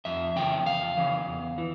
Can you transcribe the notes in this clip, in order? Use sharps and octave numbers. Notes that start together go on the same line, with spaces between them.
F2 E5
C#3 E3 G5
F2 F5
C#3 E3
E2
E3